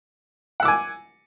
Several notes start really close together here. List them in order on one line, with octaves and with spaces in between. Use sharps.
F#5 E6 D6 G#5